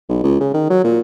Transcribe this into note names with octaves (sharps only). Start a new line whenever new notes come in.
B1
C#2
C#3
D#3
F#3
A#2